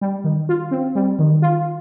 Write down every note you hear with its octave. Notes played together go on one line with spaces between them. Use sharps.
G3
D#3
F4
C4
G3
D#3
F4